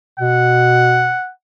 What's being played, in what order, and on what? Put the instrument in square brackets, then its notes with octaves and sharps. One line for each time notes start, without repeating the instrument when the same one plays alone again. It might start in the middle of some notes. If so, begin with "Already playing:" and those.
[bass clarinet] B2 [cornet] F#5